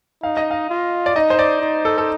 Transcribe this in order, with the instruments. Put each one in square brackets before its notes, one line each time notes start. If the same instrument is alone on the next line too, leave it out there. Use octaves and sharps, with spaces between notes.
[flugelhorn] D#4 [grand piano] F5
[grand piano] D#5
F5
[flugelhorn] F4
[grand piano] D5
[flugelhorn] D#4 [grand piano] D#5
[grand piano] C5
D5
[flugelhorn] D#4
[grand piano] A4
A4